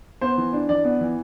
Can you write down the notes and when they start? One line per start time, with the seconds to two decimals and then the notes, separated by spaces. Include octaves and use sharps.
0.21 B3 C5
0.38 E3
0.53 D4
0.69 E3 D5
0.85 B3
1.01 E3